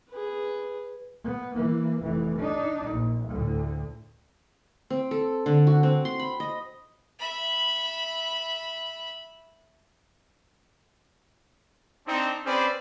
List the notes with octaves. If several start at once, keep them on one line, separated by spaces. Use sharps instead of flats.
G#4 B4
B3
E3 A#3
F1 E3
D4 D#4
A#1
D2 A2
C4
A4
D3
F#4
C4
C6
B5
D#5
E5 B5
C4 D4 D#4
C4 C#4 G#4 B4 C5 D5